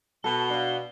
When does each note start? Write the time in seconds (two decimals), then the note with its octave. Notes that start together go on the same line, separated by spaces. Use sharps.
0.24 B2 A4 G7
0.50 D4 F5